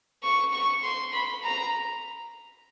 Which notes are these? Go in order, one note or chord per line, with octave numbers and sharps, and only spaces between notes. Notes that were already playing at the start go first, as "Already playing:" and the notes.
C#6
C#6
C6
B5
A#5